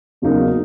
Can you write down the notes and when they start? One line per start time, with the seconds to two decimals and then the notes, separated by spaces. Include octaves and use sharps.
0.22 E2 C#3 F#3 A#3 D#4